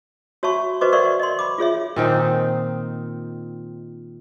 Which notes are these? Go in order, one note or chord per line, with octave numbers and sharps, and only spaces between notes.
F#4 C#5 E5 A5 B5 C#6
F#4 B4 C5 D#5 C#6 D6
A#4 D5 E5 F#5 C6 C#6
D#5 C6
B5 D6
F4 G#4 C#5 E5
A#2 D#3 C4 D#4